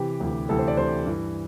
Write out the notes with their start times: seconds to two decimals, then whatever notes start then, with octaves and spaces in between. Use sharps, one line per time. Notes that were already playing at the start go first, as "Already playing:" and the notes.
Already playing: C3 E3 G4
0.20 D2 C3 E3
0.49 D2 C3 E3 A4
0.59 C5
0.68 D5
0.77 D2 C3 E3 C5
1.06 G2 E3